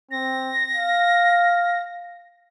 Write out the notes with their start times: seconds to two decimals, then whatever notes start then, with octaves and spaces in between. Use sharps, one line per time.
0.11 C4 A#6
0.73 F5